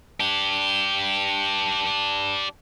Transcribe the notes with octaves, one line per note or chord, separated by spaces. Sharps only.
D4 G4